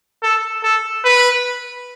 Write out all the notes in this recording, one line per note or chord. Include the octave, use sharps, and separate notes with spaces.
A4
A4
B4